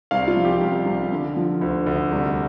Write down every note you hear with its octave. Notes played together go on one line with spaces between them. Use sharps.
C2 F5
F4
F3
G4
C2
C2
D3
F3
D2
D2
C2